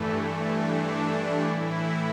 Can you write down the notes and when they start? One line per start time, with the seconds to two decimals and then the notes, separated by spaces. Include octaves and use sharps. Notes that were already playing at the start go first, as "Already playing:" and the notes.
Already playing: G2 E3 A3
0.52 D4
1.44 A2 E3 E4